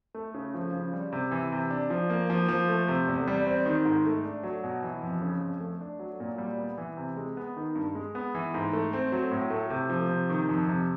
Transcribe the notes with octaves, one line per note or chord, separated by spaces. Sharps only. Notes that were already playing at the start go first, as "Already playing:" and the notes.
A3
C#3
F3
C#3
G3
C3
E3
C3
D4
F3
A#3
F3
F3
A3
C3
E2
G3
C4
D#3
G#2
A3
D4
F#3
B2
E3
F2
C#3
F2
A3
D4
F#3
A#2
G3
B3
E3
C3
G#3
B3
D#3
G2
G#3
B3
E3
G#2
A3
C4
F#3
A2
A3
C3
F3
C3
D#3
F2
C3